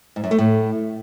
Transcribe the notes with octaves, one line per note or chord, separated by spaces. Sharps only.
G#2
F#2
A3
A2